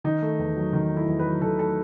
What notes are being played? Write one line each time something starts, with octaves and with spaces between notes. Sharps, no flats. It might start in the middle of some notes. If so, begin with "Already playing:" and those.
D#3 D#4
A3
E2
F#3
D#3
A3
E4
E2
B4
F#3
D#3 A4
A3 A4